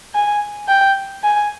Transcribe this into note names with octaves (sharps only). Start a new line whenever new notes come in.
G#5
G5
G#5